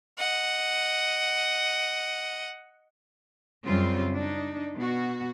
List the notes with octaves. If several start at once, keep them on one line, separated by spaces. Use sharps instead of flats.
D#5 F#5
F#2 C#3 G3 C4 F4
D4 D#4
B2 F#4